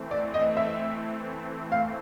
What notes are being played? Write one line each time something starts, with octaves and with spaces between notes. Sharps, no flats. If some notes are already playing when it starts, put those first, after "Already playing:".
Already playing: E3 A3 C4
D5
D#5
E5
F5